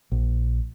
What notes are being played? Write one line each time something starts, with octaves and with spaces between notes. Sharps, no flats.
A#1